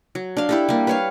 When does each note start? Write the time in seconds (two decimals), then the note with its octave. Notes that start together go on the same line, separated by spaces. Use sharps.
0.15 F#3
0.37 D4 F5
0.49 E4 G4 A4
0.69 G3 A#3
0.87 B4 C#5 F5